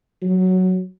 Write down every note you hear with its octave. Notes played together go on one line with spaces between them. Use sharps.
F#3